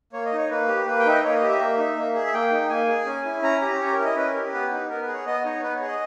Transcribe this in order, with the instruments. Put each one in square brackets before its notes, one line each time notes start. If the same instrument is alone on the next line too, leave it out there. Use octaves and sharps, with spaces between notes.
[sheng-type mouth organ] A#3 C#5
D#5
D#4 C#5
A#3 B4
G4
A#3 B4
G5
D#4 E5
D#5
A#3 C#5
D#5
G4
E5
A#3
D#4
A#3
G#4
E5
A#3 G5
D#4
A#3 G#5
G#4
C#4
E4
C#4 A#5
G4 A#5
C#4 C#5
A#4
E4
D#5
C#4 B4
A#4
G4
B3 B4
D#4
B3 A#4
B4
G#4
C#5
B3 D#5
D#4 C#5
B3 B4
C#5
G#4
D#5